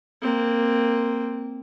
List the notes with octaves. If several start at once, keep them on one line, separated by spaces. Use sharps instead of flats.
A#3 C4